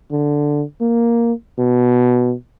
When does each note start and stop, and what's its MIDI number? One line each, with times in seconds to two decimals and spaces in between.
0.11 0.63 50
0.81 1.33 58
1.59 2.34 47